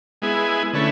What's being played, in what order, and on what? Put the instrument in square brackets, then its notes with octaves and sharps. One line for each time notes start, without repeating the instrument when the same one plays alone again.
[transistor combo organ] G#3 B3 E4 G#4
D3 A3 C#4 E4 B4